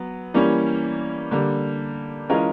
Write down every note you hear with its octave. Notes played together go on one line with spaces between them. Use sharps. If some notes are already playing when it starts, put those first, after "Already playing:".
Already playing: F#3 B3
E3 G3 A#3 C#4
D3 G3 A#3
E3 G#3 C#4 F4 A#4